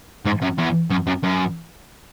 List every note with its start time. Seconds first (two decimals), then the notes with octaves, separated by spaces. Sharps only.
0.25 G#2
0.42 F#2
0.58 E2
0.90 F#2
1.07 F#2
1.23 F#2